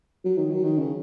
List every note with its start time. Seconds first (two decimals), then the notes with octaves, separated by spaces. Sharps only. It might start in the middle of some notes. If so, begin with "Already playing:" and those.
0.25 F#3
0.37 D#3
0.51 F#3
0.64 D#3
0.78 C#3